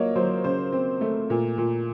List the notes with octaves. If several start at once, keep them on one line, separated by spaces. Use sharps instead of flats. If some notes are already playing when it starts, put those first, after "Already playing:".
Already playing: F#3 A#3 C#5 D#5
F#3 C5
C#3 C5
C4
A3
A#2
A#2